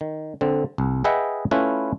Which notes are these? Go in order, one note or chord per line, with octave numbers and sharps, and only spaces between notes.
D#3
D3 C4
C2
G#4 B4 D#5 E5 F#5 G5
A3 C#4 E4 F4 B4